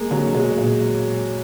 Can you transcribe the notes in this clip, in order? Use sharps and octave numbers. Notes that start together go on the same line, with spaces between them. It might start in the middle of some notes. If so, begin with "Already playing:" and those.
Already playing: G#3 A#3
D3 F#3
B2 G#3
A#2